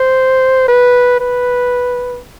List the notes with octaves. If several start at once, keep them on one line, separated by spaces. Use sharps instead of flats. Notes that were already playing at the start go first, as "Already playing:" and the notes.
Already playing: C5
B4
B4